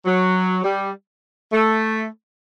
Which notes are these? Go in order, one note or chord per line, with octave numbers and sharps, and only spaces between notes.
F#3
G3
A3